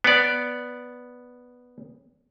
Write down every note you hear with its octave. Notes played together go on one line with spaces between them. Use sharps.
B3 D5